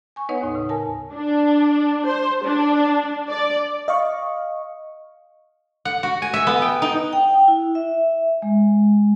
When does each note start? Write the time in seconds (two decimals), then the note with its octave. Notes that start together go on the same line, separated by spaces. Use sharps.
0.16 G#5 C#6
0.29 B3 D#4 B4 C#5 D#5 F#5
0.41 D#2 A2 D#6
0.55 C#3
0.69 A#4 G#5 A5
1.13 D4
2.05 C5
2.44 D4
3.28 D5
3.88 D#5 F5 C#6
5.85 F#5
6.03 F#4
6.22 G#5
6.34 E5
6.47 B3
6.62 G5
6.82 D#4
7.13 G5
7.48 E4
7.75 E5
8.42 G#3